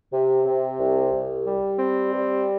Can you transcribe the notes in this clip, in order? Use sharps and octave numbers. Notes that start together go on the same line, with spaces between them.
C3
C3
C2
C2
G3
C4
G3